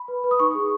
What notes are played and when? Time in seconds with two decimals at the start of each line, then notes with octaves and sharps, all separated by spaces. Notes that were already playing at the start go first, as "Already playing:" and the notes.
Already playing: B5
0.08 B4
0.24 B4
0.31 D#6
0.39 D#4 C#6
0.55 G#4